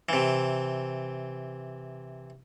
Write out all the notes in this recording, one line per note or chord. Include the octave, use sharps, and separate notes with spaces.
C3 E3